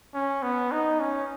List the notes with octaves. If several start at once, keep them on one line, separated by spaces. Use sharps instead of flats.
C#4
B3
D#4
C#4